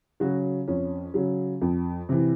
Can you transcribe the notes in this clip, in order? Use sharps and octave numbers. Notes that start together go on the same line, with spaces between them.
C#3 F#3 F#4
F2 C#4
C#3 F#3
F2
C3 E3